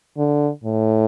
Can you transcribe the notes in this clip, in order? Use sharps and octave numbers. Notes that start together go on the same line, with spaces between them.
D3
A2